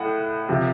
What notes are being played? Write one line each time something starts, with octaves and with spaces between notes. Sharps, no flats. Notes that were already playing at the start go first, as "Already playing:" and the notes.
Already playing: A2 F#5
C3 F3